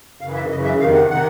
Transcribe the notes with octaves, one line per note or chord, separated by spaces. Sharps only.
F#2 C#3 E3 F5
E5
F#2 C#3 E3 D#5
E5
F2 C3 D#3 F5
F#5
C3 D#3 F#5